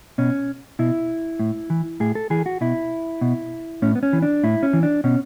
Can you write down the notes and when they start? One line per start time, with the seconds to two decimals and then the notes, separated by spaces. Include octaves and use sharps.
0.18 B2 C#4
0.79 B2 E4
1.39 A2
1.70 E3
2.00 A2 G#4
2.15 A4
2.30 E3 G#4
2.46 F#4
2.61 B2 E4
3.21 B2
3.82 A2 C#4
3.95 B3
4.03 C#4
4.13 E3
4.22 D4
4.44 A2 E4
4.63 C#4
4.73 E3
4.83 D4
5.04 B2 C#4